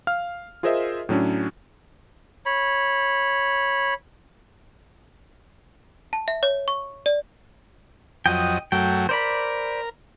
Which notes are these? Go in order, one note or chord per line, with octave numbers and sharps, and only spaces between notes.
F5 F6
F4 G#4 A#4 C5 D#5 E5
A2 F#3 C#4 D4
C#5 B5
A5
E5
C#5
C#6
D5
F2 F#3 D#5 G5 D#6
F#2 F#3 A3 G5
A#4 C5 D5 B5